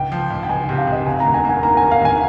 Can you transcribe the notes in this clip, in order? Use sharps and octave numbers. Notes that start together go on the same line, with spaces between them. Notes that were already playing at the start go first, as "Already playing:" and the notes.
Already playing: C#2 G5
F3
C#2
G5
C#2 G#5
G5
C3
F5
C#2
D#5
F1 G#5
A#5
D#2
G#5
A#3 G#5
A#3 A#5
D#3 G#5
F5
D#2 G#5